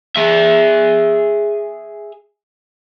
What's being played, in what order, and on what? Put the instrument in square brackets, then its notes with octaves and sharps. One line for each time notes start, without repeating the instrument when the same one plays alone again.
[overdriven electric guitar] G#4 E5